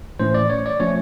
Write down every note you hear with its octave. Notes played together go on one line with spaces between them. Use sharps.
A2 E3 A3 C#4 C5
D5
C#5
D5
F3 A3 C#4 C#5